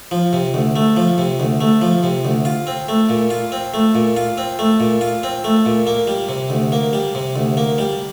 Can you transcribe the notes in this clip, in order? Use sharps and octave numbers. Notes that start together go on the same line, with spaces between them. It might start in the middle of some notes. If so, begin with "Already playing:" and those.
F3
C3
D2
A3
F3
C3
D2
A3
F3
C3
D2
F4
C4
A3
A#2
F4
C4
A3
A#2
F4
C4
A3
A#2
F4
C4
A3
A#2
A#3
G3
C3
D2
A#3
G3
C3
D2
A#3
G3